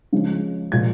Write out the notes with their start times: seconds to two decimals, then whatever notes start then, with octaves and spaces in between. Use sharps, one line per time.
0.13 C#3 F3 G#3
0.71 A#2 F3 G#3 G#6